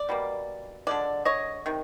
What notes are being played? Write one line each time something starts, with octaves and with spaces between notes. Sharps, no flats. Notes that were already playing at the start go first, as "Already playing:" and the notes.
Already playing: D5
B2 G3 A#3
D3 F3 G#3 D5
C#5 D#5
C3 D#3